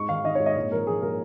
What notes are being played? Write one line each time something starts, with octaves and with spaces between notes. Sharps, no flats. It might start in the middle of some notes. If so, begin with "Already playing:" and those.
Already playing: G#2 C#6
D#3 F5
D#3 D#5
C#5
G#2
D#5
A#2 C#5
F3 A#4
F3 G#4
A#2 A#4